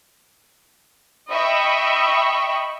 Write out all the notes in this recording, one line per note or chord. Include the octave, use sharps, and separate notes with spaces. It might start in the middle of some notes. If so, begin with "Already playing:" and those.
D#5 E5 G5 B5 C#6